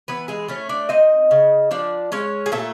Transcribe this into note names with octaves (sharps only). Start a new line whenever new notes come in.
E3 B3 B4
G#3 G#4
A3 C#4 C#5
D4 D5
C4 D#4 D#5
C#3
F3 D4 D5
G#3 C#4 C#5
G#4
A#2 A3 A4